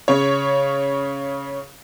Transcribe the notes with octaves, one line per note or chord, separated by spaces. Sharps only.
C#3 C#5